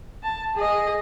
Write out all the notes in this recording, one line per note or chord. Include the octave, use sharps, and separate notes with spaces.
A5
G#4 D#5